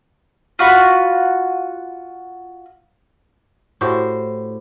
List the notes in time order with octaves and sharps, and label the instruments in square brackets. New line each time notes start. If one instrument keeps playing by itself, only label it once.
[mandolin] F4 F#4 F#5 B5
[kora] A2 F#4 G4 C5